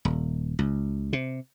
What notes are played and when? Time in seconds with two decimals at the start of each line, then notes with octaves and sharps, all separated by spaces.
0.05 D#1
0.59 C#2
1.13 C3